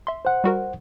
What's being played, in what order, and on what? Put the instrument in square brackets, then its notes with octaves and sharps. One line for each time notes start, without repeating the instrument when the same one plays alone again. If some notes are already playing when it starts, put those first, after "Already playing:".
[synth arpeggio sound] E5 C6
[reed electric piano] C5 F#5
[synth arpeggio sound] G3 F#4 A#4